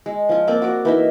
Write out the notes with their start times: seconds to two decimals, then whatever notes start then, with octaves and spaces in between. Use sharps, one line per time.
0.06 G#3
0.29 F3 F4
0.48 A#3 C4 D5 D6
0.62 F#4 A#4 D6
0.85 E3 D#4 E5